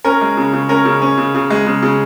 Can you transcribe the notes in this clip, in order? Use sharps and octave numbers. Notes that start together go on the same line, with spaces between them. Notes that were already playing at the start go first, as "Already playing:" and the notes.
C#4 A#4
G#3
C#3
C#3
C#4 A#4
C#3
C#4
C#3
C#3
G#3
C#3
C#3